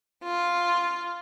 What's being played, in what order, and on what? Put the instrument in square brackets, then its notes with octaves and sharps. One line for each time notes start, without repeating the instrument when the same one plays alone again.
[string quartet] F4